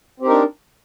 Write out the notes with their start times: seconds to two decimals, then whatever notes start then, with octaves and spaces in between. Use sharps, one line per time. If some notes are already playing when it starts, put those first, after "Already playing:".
0.20 C4
0.22 G4
0.25 D#4
0.27 A#4
0.30 D4